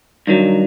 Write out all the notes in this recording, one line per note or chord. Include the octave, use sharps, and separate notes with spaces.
G2 D#3 F#3